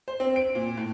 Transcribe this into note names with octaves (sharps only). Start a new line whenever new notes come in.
C5
C4
D7
A#2
A2